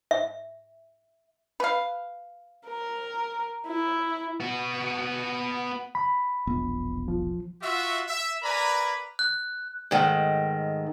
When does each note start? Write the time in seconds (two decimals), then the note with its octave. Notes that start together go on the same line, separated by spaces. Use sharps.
0.11 E5
1.60 B4 F5
2.67 A#4
3.67 E4
4.40 B3 F#4
5.95 B5
6.47 E1 A#1 B3
7.08 F3
7.62 F4 F#4 E5
8.08 E5
8.43 A#4 B4 D5 G#5 A#5 B5
9.19 F#6
9.91 G#2 D#3 A3